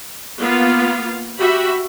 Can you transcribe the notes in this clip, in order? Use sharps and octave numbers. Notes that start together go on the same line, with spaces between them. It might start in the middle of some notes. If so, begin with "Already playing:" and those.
A#3 B3 F4 F5
F#4 G4 E5 B5